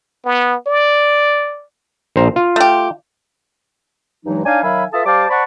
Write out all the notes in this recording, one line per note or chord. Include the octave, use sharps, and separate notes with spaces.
B3
D5
A#1 C5 A#5
F4
A3 G4
G2 E3 F#3 G#3 D#4
D4 D#4 C#5 F5 G#5
D#3 F#3 E5 F5 G#5 B5
F4 A4 B4 E5 A5 D#6
G3 C5 F5 A5 D6
C5 D5 F#5 A5 B5 C#6